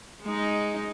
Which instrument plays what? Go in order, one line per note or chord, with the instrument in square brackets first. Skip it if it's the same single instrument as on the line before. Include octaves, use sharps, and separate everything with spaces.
[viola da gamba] G#3 D#4